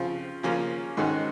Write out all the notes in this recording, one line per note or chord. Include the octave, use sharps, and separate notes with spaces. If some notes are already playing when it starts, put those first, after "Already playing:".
Already playing: C#3 F3 C4 F4
C#3 F3 A#3 C#4 F4
G#2 D#3 G#3 C#4 F#4